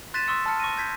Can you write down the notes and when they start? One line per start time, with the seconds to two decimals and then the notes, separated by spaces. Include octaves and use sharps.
0.14 C6 F#6 A6 B6 D#7 E7
0.27 C6 C#6 D#6 E6 F#6 C#7
0.46 A5 B5 F6 C#7
0.60 C#6 A#6 D#7
0.77 G6 G#6 B6